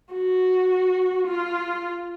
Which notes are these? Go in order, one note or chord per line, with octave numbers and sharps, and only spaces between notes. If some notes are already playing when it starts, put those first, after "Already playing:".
F#4
F4